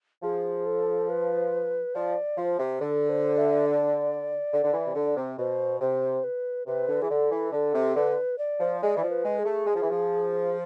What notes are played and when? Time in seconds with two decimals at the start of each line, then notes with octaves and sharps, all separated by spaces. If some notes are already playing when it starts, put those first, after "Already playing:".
0.23 F3 G#4
0.66 A4
1.09 B4
1.95 F3 D5
2.38 F3 C5
2.59 C3
2.81 D3 A4
3.09 C5
3.38 E5
3.66 D5
4.53 D3
4.64 D3
4.74 E3
4.85 C3
4.95 D3
5.17 C3
5.38 B2 C5
5.81 C3 C5
6.24 B4
6.67 C3 B4
6.88 D3
7.02 E3 G#4
7.10 D3 A4
7.31 E3
7.52 D3 A4
7.74 C3
7.96 D3 B4
8.38 D5
8.60 F3
8.82 G#3 D5
8.97 E3
9.03 F3
9.10 B4
9.24 G#3
9.39 G#4
9.45 A3
9.67 G#3
9.75 F3
9.83 E3
9.90 F3